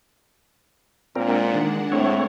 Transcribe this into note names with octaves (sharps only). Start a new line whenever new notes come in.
A#2 G#3 C4 D4 A#4 F#5
D#3
A2 A3 C4 C#5